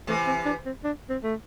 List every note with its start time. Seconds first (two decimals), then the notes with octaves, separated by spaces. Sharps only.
0.07 C3 E3 A3
0.27 C4
0.45 D4
0.66 C4
0.84 D4
1.10 C4
1.23 A3